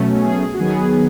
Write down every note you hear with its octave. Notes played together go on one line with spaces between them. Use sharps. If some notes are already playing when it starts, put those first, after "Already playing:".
Already playing: B2 F#3 A3 C#4
G#4
F#4
D#3 F#3 B3 G#4